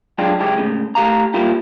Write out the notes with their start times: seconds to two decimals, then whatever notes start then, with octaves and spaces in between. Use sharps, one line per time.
0.18 F#3 G#3 D4 F4 G5
0.40 C#2 F#2 G#3 E4 G4 G5
0.58 A2 C#3 G#3
0.95 A3 G4 F5 A#5
1.34 G3 A#3 E4 F4 G4